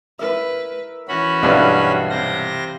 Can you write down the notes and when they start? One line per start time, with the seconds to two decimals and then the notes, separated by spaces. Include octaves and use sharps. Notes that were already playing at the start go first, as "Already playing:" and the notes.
0.19 E4 A#4 B4 E5
1.08 E3 C#4 F#4 B5
1.43 B1 G2 G3 E4 B4 F5
2.10 C3 C5 A#6